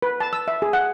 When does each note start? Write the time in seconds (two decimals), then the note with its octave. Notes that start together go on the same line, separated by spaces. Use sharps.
0.02 B4
0.20 A5
0.33 E6
0.48 E5
0.62 G#4
0.73 F#5